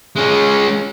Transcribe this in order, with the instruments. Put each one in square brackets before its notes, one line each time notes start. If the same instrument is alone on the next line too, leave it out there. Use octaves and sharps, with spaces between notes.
[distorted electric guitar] G#3 C#4